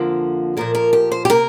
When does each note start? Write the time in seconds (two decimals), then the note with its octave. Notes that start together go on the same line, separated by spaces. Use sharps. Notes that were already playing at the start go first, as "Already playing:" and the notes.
Already playing: F2 D3 F3 A#3 F4
0.57 A#2 F3 A#3 A#4
0.75 A#4
0.93 G4
1.12 C5
1.25 G4
1.30 C3 A#3 A#4